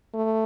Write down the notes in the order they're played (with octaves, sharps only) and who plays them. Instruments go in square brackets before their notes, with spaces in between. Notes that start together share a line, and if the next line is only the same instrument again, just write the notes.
[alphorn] A3